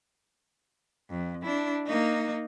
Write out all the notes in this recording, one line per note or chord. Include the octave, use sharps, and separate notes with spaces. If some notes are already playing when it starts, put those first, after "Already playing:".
F2
D4 E4
A#3 D#4